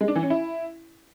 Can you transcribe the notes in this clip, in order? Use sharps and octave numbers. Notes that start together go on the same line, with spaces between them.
G#3
D4
E3
C#4
E4